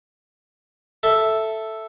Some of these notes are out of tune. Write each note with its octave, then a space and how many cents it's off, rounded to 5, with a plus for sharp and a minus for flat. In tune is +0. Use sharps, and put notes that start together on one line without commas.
A4 +0 E5 +0